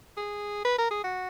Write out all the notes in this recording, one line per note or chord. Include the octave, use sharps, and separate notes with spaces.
G#4
B4
A#4
G#4
F#4